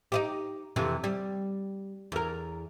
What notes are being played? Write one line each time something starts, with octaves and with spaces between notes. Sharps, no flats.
D#4 E4 G4
F2 C3 E3
G3
E2 A#4